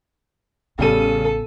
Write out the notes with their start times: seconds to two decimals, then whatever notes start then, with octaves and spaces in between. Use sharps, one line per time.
0.79 A1 C#3 G3 B3 A4 D#7